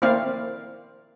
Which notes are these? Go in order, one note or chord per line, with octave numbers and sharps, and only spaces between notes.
A#3 C4 E4 D5 F5